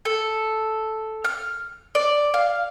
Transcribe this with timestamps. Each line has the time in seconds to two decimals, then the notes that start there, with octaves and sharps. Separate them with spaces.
0.05 A4
1.24 F6
1.95 D5
2.34 F5